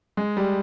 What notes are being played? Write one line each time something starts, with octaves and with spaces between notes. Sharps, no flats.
G#3
G3